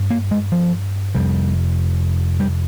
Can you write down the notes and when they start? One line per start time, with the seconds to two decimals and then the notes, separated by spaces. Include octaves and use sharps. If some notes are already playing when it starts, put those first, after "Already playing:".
Already playing: G2
0.10 A#3
0.31 G#3
0.52 F3
1.15 F2 C3 G3
2.40 G3